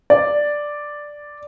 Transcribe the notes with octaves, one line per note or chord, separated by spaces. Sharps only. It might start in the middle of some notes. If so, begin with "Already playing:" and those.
D5